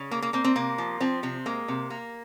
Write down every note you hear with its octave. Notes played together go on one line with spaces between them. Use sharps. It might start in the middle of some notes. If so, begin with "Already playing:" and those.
Already playing: C#3
A#3
A#3
A#3 C4
C4
C3 A#3
F3
F3 C4
C3 C4
G#3 A#3
C3
A#3